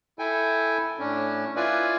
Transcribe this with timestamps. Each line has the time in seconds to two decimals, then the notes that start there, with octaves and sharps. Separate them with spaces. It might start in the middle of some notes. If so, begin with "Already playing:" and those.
0.19 E4 A4 G5 G#5
0.99 A2 C#4 D4
1.56 E4 F4 B4 D5 G#5